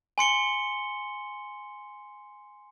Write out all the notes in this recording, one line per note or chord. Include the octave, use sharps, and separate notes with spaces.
G#5 C6 C#7 G7